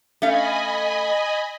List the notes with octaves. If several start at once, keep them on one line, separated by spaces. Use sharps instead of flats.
A3 C#4 D#5 F5 G#5 B5